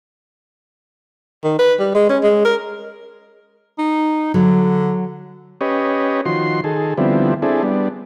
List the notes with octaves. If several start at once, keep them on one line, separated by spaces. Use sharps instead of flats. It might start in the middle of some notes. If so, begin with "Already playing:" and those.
D#3
B4
G3
G#3
C#4
G#3
A#4
D#4
D3 F#3
C#4 G4 B4 C#5 D#5
D#3 F3 F#4 C6
D#3 G#4 A4
D3 F3 G3 B3 C4 E4
C4 D4 E4 G#4 A4
G3 B3 D4